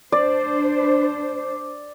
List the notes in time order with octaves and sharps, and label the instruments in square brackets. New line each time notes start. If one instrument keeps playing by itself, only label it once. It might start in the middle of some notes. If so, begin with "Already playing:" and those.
[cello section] D4 C5 [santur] D5